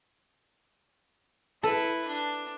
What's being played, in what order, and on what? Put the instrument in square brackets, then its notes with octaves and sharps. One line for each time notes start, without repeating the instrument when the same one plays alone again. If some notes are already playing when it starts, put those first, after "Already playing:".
[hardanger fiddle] E4 B4 [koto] A4
[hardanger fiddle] D4